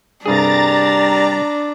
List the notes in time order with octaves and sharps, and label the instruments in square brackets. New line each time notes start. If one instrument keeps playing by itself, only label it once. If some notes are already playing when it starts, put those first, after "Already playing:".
[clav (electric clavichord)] C2 G2 G#4 [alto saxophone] G3 [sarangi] D4 [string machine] A#5 A6